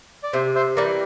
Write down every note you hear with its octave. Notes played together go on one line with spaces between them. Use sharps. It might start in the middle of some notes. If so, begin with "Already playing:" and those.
D5
C3 C5 E5
C5 E5
E3 G3 A#4 D5